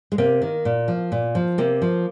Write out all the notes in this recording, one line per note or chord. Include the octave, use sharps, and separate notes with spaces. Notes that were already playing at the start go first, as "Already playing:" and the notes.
G#3
C3 A#3
D#3
A#2
F3
A#2
F3
C3 A#3
F3